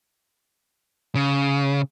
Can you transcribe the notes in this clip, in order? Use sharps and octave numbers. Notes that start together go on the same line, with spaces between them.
C#3